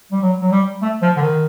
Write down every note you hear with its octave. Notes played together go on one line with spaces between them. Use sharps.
G3
F#3
F#3
G3
A3
F3
D3
D#3